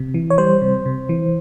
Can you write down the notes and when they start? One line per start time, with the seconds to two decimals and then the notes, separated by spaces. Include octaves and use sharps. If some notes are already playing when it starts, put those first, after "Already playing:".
Already playing: C3
0.14 E3
0.30 C#5
0.38 G3 C5
0.62 C3
0.86 C3
1.09 E3